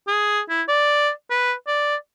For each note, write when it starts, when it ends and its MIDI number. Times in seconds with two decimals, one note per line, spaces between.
0.08 0.40 68
0.49 0.62 64
0.68 1.10 74
1.30 1.53 71
1.67 1.96 74